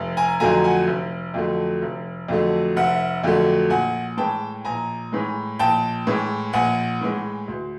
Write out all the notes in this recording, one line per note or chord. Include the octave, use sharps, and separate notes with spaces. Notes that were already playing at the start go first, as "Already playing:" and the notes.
Already playing: F1
G#5 A#5
F2 D3 F#3 A3 G#5 A#5
F#5 G#5
F1
F2 D3 F#3 A3
F1
F2 D3 F#3 A3
F1 E5 F#5
F2 D3 F#3 A3
A#1 F#5 G#5
A2 E3 G#3 G5 A5
A#1 G#5 A#5
A2 E3 G#3
A#1 G5 A5
A2 E3 G#3
A#1 F#5 G#5
A2 E3 G#3
D2